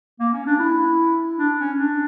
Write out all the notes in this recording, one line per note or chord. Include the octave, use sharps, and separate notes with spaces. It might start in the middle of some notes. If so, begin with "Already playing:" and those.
A#3
C#4
D4
E4
D4
C#4
D4